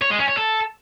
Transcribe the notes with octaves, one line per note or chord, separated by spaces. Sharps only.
C#5
G#3
C#4
C#5
A4